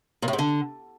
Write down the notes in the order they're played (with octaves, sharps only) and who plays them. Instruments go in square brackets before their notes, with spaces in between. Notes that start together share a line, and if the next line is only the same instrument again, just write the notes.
[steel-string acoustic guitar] A#2
A2
G#2
D3